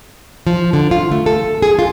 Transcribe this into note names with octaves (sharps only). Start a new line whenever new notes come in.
F3
D3
F4
A3
A4
G#4
F4